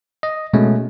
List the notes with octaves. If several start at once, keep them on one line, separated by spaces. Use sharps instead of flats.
D#5
B2 G#3 A3 C#4